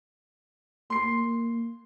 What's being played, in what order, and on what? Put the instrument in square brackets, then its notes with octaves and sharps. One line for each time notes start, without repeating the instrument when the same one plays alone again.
[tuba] A#3 [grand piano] C6 C7